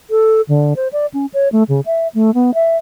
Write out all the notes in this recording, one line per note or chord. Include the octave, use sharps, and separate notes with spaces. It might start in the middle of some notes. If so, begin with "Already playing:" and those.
A4
D3
C5
D5
C#4
C#5
A3
C#3
E5
A3
B3
E5